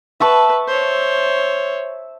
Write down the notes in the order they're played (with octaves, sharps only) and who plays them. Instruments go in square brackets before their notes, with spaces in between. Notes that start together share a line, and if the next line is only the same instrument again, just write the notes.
[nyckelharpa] B4 [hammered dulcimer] E5 A5 C#6
[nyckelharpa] C5 C#5